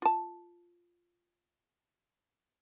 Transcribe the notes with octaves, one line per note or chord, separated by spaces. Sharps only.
F4 A5